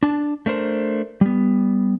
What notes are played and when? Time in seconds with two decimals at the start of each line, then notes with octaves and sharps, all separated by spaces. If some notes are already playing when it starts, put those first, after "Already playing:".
0.03 D4 A5
0.46 A3 D4 A#4 C5
1.21 G3 B3